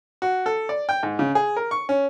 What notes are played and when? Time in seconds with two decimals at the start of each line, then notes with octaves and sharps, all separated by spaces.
0.22 F#4
0.46 A4
0.69 D5
0.89 G5
1.03 G#2
1.19 C#3
1.35 G#4
1.56 A#4
1.71 C#6
1.89 C#4